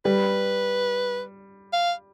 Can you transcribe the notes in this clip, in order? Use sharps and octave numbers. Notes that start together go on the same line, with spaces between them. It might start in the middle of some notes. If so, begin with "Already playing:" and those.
G3 B4
F5